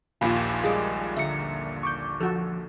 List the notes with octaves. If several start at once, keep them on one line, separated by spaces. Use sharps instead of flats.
A#1 D#2 A#2 F4 G4 F5 G#5 B5
G3 G#3 G#4 D6
D3 E5 A#5 C#7
C#6 D6 G6
F3 F#4 A4